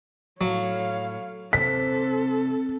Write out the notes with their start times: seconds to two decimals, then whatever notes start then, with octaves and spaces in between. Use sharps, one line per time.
0.41 A2 F#3 C#5 F5
1.53 C3 A4 B6